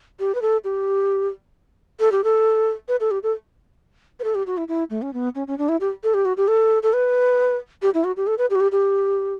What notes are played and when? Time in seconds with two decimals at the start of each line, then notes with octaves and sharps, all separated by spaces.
0.20 G4
0.35 B4
0.42 A4
0.64 G4
2.00 A4
2.12 G4
2.24 A4
2.88 B4
3.00 A4
3.11 G4
3.23 A4
4.20 B4
4.24 A4
4.35 G4
4.47 F#4
4.57 E4
4.68 E4
4.90 A3
5.02 C#4
5.13 B3
5.35 C#4
5.47 C#4
5.58 D4
5.69 E4
5.81 G4
6.04 A4
6.14 G4
6.25 F#4
6.37 G4
6.48 A4
6.83 A4
6.93 B4
7.82 G4
7.94 E4
8.04 F#4
8.17 G4
8.27 A4
8.38 B4
8.50 G4
8.55 F#4
8.60 G4
8.72 G4